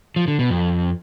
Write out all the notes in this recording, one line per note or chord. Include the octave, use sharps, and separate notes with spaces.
F3
D3
B2
F2